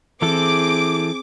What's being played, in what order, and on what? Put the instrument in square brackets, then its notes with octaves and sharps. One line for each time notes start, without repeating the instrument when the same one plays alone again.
[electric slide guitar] E3 E4 A4 [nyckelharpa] C4 G#4 [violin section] D6